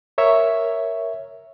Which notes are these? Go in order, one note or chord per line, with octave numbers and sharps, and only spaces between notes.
A#4 C#5 E5